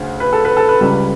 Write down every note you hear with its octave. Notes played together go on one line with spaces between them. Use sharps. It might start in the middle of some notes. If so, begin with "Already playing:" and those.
Already playing: D2 C#3
B4
A4
B4
A4
B4
C#2 C#3 G3